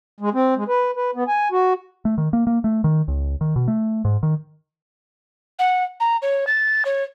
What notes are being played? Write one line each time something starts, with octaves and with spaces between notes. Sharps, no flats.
G#3
C4
G#3
B4
B4
B3
G#5
F#4
A3
D#3
A#3
A#3
A3
D#3
C#2
D#3
B2
A3
G#2
D#3
F#5
A#5
C#5
A6
C#5